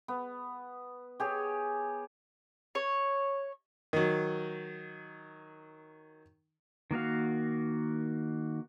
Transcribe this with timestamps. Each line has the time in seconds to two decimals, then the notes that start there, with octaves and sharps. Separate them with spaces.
0.08 B3
1.20 G4 G#4 C#5
2.75 C#5
3.93 D#3 F#3
6.91 D#3 A#3 F#4 F5